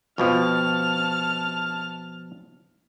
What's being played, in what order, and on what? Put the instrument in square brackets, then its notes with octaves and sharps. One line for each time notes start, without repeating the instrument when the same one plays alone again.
[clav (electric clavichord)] F2 B2 F3 [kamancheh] A5 F6